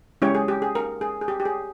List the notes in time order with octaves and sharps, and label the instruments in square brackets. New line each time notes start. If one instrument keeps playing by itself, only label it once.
[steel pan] G#3 C#4 E4 G4 C#5
G#4
G4
G#4
A#4
G#4
G#4
G4
G4
G#4